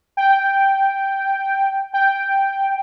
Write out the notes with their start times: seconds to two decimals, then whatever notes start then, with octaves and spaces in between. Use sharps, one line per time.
0.17 G5
1.93 G5